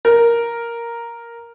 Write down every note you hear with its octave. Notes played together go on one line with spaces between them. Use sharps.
A#4